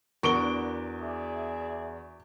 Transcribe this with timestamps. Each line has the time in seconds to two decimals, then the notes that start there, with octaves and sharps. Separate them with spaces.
0.23 E2 D4 F#4 A#4 C#6 D7 G7
1.00 G#4 D5 E5